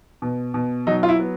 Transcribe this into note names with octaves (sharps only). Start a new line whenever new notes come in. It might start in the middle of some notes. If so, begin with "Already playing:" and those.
B2
B2
F#3 D#4
F4
E4
B3